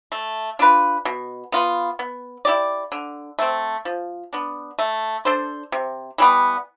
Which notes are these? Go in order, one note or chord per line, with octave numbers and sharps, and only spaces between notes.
A3
D4 F4 B4
B2
B3 F4 B4
B3
E4 G4 D5
D3
A3 C4
F3
B3 D4
A3
D4 A4 C5
C3
E3 G3 B3